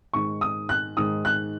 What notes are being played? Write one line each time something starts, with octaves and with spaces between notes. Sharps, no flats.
G#2 D#3 C#6
D#6
F#6
G#2 D#3 D#6
F#6